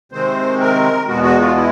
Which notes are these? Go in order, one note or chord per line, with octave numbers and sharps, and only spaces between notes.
C3 D#3 G#3 C4 C5
A#4
E2 B2 G#3 B3 F#4
F#4
F4
E4